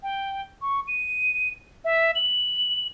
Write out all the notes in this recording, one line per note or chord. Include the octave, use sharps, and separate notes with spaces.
G5
C#6
D#7
E5
F#7